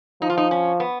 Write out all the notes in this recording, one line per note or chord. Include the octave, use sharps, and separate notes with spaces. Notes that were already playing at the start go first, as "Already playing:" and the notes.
F3 D#4
F4
D#4
C#4
B3